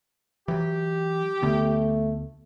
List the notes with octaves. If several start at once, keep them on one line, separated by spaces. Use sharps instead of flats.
E3 F#3 G4
D2 D3 A3 B3